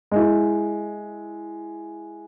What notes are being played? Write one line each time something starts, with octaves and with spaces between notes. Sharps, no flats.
G#3 E4